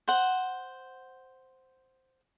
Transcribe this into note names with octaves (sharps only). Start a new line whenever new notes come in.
C5 F#5